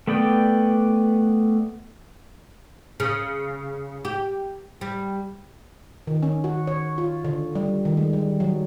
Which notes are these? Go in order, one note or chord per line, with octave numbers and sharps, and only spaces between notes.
A3 B3 B4 D5 G5
C#3
G4
G3
D#3
C#4
F#4
C#5
F4
D3
G3
D#3
G#3
G3
F#3